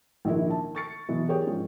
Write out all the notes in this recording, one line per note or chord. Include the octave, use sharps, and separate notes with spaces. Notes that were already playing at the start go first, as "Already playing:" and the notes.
A#1 D#3 D4 E4 A#4
A5
C#6 A6 C#7
B2 E3 F#3
G4 G#4 A#4 C#5 D5 G5
G#2 F3 C#4